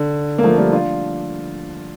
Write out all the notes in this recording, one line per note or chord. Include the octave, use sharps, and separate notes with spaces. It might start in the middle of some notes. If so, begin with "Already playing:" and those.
Already playing: D3
A#3
F3 A3
G3 A#3
D4 F4